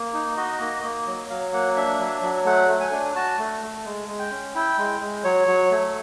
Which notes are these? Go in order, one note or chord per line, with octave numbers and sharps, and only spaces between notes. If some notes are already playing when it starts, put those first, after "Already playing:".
Already playing: A#3
D#4
F#4 D#5
A#3
A#3
F#3
F#3 F5
A#3 F#5
D4 E5
F#3
F#3
A3 F#5
A3
G#5
D4
F#4 A5
A3
A3
G#3
G#3
G5
C#4
E4 G5
G#3
G#3
F#3 C#5
F#3
A3